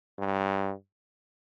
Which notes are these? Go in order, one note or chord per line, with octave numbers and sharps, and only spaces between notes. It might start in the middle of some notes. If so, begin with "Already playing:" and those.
G2